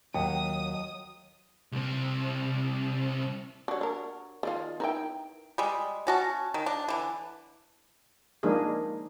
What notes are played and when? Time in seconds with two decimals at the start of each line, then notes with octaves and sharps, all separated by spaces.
0.14 D#2 F#3 G5 D#6
1.72 C2 C4
3.68 G3 D4 F#4 C#5
3.81 D4 A#4
4.43 D#3 F3 F4 G#4 D5 F5
4.80 D#4 E4 A#4 B4 G5
5.58 G3 G#3
6.07 C#4 F#4 A5
6.54 D#3
6.66 D4
6.88 D3 E3
8.43 F3 G#3 A#3 D4 D#4 G#4